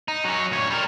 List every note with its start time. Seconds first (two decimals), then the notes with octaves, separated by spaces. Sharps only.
0.08 D#4
0.25 F#3 C#4
0.52 D2 C#5
0.70 G3 A#4